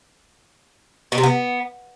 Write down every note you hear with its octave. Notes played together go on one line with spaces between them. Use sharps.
B2
C3
B3